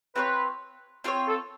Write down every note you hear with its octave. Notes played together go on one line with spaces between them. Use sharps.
C4 F4 A#4 B4 C#5
C4 F4 A#4 C#5
A4